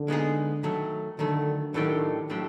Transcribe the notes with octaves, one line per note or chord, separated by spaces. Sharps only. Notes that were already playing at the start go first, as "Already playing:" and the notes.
Already playing: D3
G#3 B3 D#4 G#4
D#3 F#3 A3
D3 D#3 F#3 A3
A2 D#3 F#3 A3 D4 G4
A2 F#3 A3 D4 G4